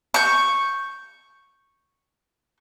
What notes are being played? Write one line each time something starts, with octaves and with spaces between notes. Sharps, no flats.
C#6 G6